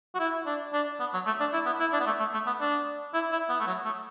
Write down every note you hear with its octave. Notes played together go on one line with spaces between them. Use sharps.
F#4
E4
D4
D4
B3
F#3
A3
D4
E4
B3
E4
D4
B3
A3
A3
A3
B3
D4
E4
E4
B3
A3
F#3
A3